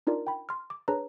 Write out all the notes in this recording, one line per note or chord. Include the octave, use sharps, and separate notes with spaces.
D4 D#4 F4 A#4 D5
G5 B5
C6 F6
D6
D4 G#4 B4 C#5 A5 A#5